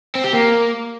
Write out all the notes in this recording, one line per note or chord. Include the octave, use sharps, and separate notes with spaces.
C4
G4
A#3